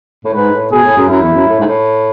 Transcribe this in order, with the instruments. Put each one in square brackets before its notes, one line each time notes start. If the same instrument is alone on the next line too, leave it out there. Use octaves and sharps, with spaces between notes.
[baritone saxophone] A2
[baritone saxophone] G#2 [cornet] B4
[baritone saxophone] A2
[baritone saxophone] B2 [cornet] G#4
[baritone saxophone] A2
F#2
[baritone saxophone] F#2 [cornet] E4
[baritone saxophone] E2
F#2
A2
G#2
A2